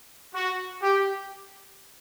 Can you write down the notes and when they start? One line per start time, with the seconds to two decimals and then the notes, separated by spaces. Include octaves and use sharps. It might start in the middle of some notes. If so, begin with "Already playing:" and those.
0.34 F#4
0.82 G4